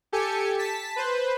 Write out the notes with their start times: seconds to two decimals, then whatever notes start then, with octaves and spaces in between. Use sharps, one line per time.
0.12 G4 A4 G#5 C#7
0.59 A5 B6
0.96 B4 C5